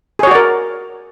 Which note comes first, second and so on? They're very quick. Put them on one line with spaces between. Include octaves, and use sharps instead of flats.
G#4 C#5 F#4 D5 A#4